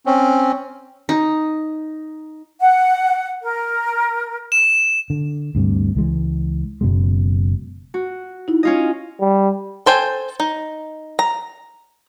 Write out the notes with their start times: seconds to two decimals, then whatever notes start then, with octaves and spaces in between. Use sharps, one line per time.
0.06 C4 C#4
1.09 D#4
2.60 F#5
3.43 A#4
4.52 E7
5.10 D3
5.55 D2 G2 C3
5.95 C#2 E3 G#3
6.81 F#1 F#2 B2 G#3
7.94 F#4
8.48 D#4 E4
8.63 C#4 F4 D#5
9.21 G3
9.86 A4 C5 G5 G#5
10.40 D#4
11.19 A#5